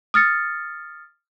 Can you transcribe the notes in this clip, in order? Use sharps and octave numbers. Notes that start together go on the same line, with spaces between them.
D#6 F6 A6 C#7